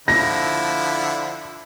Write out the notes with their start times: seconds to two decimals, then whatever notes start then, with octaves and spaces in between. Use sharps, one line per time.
0.08 D3 F3 E4 A#6